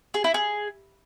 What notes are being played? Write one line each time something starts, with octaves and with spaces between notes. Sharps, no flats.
G#4
E4
G#4